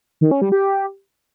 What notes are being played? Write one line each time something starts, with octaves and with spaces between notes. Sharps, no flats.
D#3
C#4
G3
G4